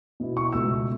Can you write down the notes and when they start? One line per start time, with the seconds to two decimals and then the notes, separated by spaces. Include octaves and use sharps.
0.20 B2 B3 E4
0.37 C#6
0.52 C#2 B2 A3 E6